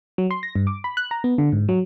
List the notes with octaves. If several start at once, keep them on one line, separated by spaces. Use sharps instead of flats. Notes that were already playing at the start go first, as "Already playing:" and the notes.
F#3
C6
A#6
G2
D6
B5
F#6
A#5
B3
D3
G#2
F#3